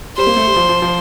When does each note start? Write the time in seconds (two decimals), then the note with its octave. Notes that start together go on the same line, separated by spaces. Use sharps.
0.17 G3 C5
0.27 A#3
0.36 A3
0.47 G3
0.56 F3
0.69 F3
0.82 F3